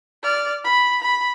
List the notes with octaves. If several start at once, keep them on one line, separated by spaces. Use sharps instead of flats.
D5 F6
B5
B5